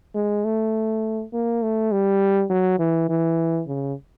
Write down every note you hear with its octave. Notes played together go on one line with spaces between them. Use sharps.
G#3
A3
A#3
A3
G3
F#3
E3
E3
C#3